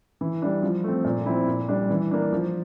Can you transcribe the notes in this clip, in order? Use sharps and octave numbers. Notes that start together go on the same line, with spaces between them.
E3
G3 D4
F3
A3 C4
A#2
F3 C4 E4
A#2
G3 D4
E3
A#3 D4
F3